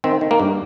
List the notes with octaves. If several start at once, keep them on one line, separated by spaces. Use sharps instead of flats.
D#3 C4
D#3
A#3
G2